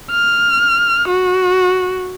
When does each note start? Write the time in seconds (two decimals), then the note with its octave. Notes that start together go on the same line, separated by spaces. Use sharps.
0.11 F6
1.08 F#4